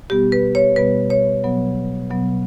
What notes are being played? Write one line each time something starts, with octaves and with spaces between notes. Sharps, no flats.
B2 G3 B3 G4
B4
C#5
B2 G3 B3 B4
C#5
B2 F#3 B3
B2 F#3 B3